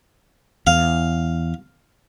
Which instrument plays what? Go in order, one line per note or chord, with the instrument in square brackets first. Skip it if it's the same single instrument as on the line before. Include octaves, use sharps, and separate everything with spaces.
[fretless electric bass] E2 [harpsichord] F5